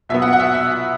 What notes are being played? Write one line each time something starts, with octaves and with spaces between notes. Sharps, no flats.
B2 F#3 B3 E5
F#5
F#5
E5
E5